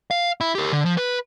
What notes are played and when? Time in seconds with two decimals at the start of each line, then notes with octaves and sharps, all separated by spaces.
0.11 F5
0.41 E4
0.55 G4 A#4
0.72 D3
0.86 F3
0.97 B4